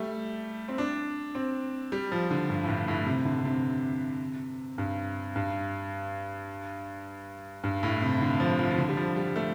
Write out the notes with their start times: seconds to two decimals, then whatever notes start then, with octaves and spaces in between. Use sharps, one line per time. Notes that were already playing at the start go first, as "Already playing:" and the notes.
Already playing: G3 A3
0.68 C4
0.78 D4
1.35 C4
1.92 G3
2.12 F3
2.31 D3
2.50 G2
2.64 A2
2.68 G2
2.88 A2
3.06 C3
3.25 D3
3.38 D3
3.45 C3
4.78 G2
5.36 G2
7.64 G2
7.83 A2
8.02 C3
8.22 D3
8.40 F3
8.59 F3
8.71 F3
8.78 D3
8.89 G3
8.97 F3
9.16 G3
9.36 A3